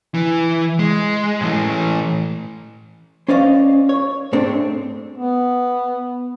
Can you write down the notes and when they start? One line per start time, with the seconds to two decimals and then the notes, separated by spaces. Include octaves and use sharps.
0.14 E3
0.79 G#3
1.41 A2 E3
3.28 C#4 C5 D5 D#5 F5
3.89 C#5
4.33 G#2 G#3 A3 C4 D4
5.18 B3